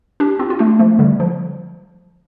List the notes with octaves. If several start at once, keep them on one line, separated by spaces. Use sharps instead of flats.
D4 G4
C4 F4
F4
A3 D4
F3 A3
D3 G3
F3